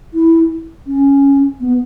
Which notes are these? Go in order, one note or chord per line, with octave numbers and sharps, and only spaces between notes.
E4
C#4
B3